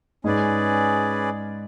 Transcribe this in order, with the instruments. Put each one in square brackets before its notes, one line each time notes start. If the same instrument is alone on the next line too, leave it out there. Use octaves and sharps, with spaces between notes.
[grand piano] G#2 [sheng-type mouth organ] C#4 G#4 B4 D5